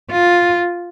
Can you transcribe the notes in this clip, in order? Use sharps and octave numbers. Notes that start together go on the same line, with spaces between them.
F4